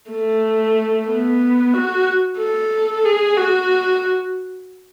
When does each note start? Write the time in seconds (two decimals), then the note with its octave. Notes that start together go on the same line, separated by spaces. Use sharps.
0.10 A3
1.08 B3
1.74 F#4
2.39 A4
3.05 G#4
3.37 F#4